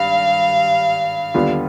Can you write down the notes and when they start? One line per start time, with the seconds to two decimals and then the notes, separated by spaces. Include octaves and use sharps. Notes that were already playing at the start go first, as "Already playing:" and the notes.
Already playing: G#1 G2 F5
1.34 D#2 D3 G3 B3 F4